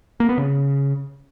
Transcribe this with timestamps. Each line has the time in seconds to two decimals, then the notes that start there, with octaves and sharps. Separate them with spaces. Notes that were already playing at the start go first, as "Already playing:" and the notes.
0.20 A#3
0.29 B3
0.38 C#3